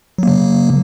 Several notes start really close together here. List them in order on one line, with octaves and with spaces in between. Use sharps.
F#3 A#3 C#3